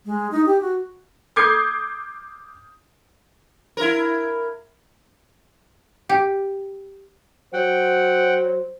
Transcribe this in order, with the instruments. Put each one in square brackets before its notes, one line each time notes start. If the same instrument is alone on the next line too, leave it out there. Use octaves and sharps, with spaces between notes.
[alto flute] G#3
D#4
G4
F#4
[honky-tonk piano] D6 D#6 G6 G#6 C7
[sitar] E4 A#4
[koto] G4
[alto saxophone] F#3 [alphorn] C5 [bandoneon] F#5 G5